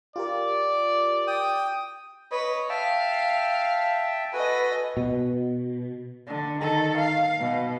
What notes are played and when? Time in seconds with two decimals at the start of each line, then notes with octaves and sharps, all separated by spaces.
0.16 F4 G4 A#4 D5
1.27 G5 D#6
2.31 B4 C#5 D#5
2.69 E5 F5 G5 A5
4.33 F#4 A4 B4 D#5 G#5
4.97 B2
6.27 D3
6.59 D#3 A4
6.98 F5
7.40 B2